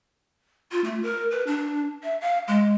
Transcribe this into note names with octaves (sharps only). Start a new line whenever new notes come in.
F4
A3
A#4
B4
D4
E5
F5
G#3